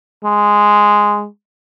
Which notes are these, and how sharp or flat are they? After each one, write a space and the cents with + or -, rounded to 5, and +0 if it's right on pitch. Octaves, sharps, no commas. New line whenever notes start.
G#3 -5